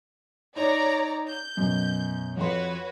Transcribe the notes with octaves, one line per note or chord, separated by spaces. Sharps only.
D#4 C#5 D5 A#5
G6
F#2 B2
F2 F#4 B4 C#5 C6